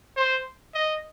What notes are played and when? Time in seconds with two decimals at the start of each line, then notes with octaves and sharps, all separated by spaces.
0.17 C5
0.75 D#5